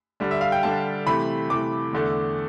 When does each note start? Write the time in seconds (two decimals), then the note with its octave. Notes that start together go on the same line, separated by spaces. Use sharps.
0.20 D3 G3 D4
0.31 E5
0.41 F5
0.52 G5
0.63 D3 G3 D4 A5
1.06 C3 E3 A3 B5
1.50 C3 E3 A3 D6
1.93 E2 D3 A3 D4